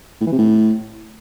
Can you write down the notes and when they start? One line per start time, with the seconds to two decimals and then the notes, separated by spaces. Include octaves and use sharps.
0.21 A2
0.27 E3
0.33 C3
0.38 A2